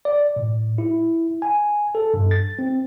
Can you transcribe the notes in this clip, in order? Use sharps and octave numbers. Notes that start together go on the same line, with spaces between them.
D5
A2
E4
G#5
A4
G2
A6
C4